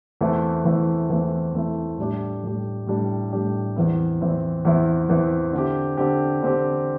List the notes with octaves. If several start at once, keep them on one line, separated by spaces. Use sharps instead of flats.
E2 E3 A3 C4 E4
E2 E3 A3 C4 E4
E2 E3 A3 C4 E4
E2 E3 A3 C4 E4
A2 G3 D4 G4
A2 G3 D4 G4
A2 G3 D4 G4
A2 G3 D4 G4
E2 E3 C4 E4
E2 E3 C4 E4
E2 E3 C4 E4
E2 E3 C4 E4
D3 C4 G4
D3 C4 G4
D3 C4 G4